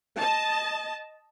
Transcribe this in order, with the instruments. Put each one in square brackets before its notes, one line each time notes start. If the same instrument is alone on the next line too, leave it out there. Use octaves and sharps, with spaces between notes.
[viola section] D#5 A5